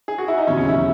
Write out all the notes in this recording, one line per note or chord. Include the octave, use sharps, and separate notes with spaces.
G#4
F#4
E4
D#4
E1 D#2 C#3 F#3 C#4
C#4
E4